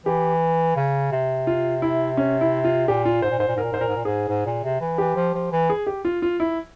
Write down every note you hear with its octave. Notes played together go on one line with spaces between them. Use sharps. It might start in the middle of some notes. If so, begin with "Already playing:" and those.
E3 G4
C#3
C3
F4
E4
C#4
E4
F4
A#2 G4
F4
G#2 C5
A#2
G#2 C5
A#2
G#2 A#4
A#2
G#2 C5
A#2 A#4
G#2
A#2
G#2 G#4
G#2
A#2
C3
E3
E3 G4
F3
F3
E3
G#4
G4
F4
F4
E4